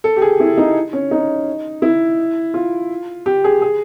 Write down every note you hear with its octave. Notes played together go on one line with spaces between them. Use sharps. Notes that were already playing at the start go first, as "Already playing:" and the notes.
A4
G4
G#4
E4
D#4
C#4
D#4
E4
F4
G4
G#4
G#4